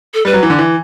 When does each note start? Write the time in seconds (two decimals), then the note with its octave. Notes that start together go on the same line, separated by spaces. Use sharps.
0.14 A4
0.25 G3 B4
0.33 F#3
0.43 E3
0.50 D3
0.59 E3